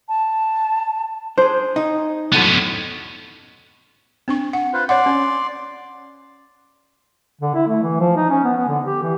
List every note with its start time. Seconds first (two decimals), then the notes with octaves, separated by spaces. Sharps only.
0.09 A5
1.38 D4 G#4 C5
1.76 D#4
2.33 A2 D3 F#3 B3 C#4
4.28 C4 D4 C#6
4.53 F#5
4.73 F4 B4 C5
4.89 C#5 D5 F#5 C6
5.06 C#4
7.41 D3
7.55 E4
7.67 A3
7.82 E3
8.00 F3
8.16 D#4
8.30 C#4
8.44 B3
8.56 B3
8.68 D3
8.85 G4
9.02 E3